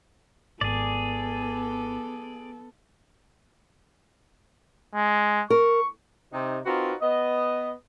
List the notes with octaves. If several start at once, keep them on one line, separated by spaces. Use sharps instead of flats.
G#1 B3 G#4 A4 D5
G#3
A#4 C#6
C3 D#4
C4 D#4 F4 F#4 A#4 B4
B3 D#5